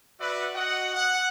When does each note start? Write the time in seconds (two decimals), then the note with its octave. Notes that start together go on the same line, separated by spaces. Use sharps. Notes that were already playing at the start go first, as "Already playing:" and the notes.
0.19 F#4 B4 D5 E5 F#5
0.55 F#4 D#5 F#5
0.95 F#5